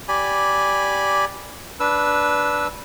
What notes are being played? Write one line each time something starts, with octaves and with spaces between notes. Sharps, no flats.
G4 D5 G#5 B5
D4 B4 E6